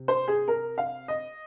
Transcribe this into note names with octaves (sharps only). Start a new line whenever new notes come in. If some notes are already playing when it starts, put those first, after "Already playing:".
Already playing: C3
C5
G#4
A#4
F5
D#5